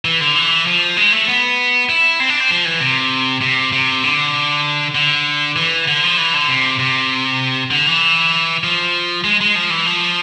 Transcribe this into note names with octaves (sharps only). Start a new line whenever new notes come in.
E3
D3
E3
F3
G#3
A3
B3
E4
C4
D4
C4
F3
E3
C3
C3
C3
D3
D3
E3
D3
F3
E3
D3
C3
C3
D3
E3
F3
G#3
G#3
F3
E3
F3